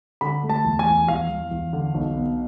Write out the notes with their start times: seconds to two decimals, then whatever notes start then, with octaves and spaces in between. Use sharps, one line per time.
0.21 D3 B5
0.43 A3
0.50 A5
0.65 E2
0.79 G#5
0.87 E2
1.08 E2 F5
1.30 E2
1.51 E2
1.73 D3
1.94 B1
2.17 B2